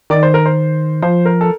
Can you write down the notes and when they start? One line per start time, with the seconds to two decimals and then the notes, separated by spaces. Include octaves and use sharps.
0.10 D#3 D5
0.23 C5
0.34 A#4
0.46 C5
1.02 F3 C5
1.26 A#4
1.41 A4